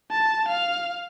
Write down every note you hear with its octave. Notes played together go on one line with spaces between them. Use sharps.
A5
F5